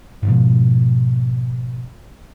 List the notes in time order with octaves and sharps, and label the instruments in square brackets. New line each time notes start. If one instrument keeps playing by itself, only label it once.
[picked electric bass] G#2 B2 F3